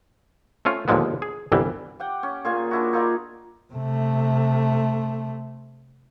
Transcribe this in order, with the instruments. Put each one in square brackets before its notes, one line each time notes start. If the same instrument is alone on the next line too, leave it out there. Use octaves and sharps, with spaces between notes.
[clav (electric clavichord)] A3 C4 C#4 F4
D#2 A#2 D3 F3 G#3 B3
G#4
G1 C2 E3 G3
[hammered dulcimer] G4 F#5 G5
C#4
A#2 F4 G#4 G#5
D4 E4 F#4
D#4 F4 A#4 D5
[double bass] C3 A3